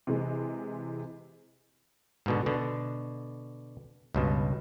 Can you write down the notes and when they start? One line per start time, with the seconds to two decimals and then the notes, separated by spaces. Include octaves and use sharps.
0.07 C3 E3 G#3
2.26 G#2 B2 D3
2.46 B2 D3
4.15 C#2 G2 B2